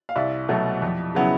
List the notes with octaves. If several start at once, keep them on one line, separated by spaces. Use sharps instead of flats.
F5
C2 D5 E5
B2 F#3 A3
F2
C#3 F#3 B3 E4